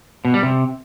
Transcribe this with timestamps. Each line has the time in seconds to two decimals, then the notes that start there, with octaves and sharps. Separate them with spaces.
0.25 B2
0.34 G3
0.43 C3